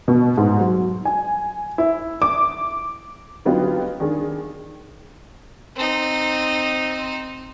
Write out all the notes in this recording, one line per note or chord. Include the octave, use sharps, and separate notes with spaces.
B2
G#2
F#3
G#5
E4
D6
D3 F#3 B3 D#4 F4 G4
D#3 D4 G#4
C4 D#4